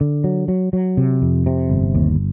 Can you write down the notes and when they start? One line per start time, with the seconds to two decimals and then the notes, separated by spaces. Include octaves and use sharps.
0.01 D3
0.24 F#3
0.48 F#3
0.73 F#3
0.97 C3
1.22 F2
1.46 C3
1.69 G1
1.95 D#2